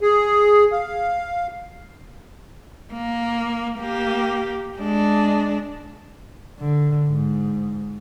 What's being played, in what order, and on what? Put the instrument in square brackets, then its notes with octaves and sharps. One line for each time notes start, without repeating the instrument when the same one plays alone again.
[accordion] G#4
F5
[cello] A#3
A#3 G4
G#3 D4
[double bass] D3
G#2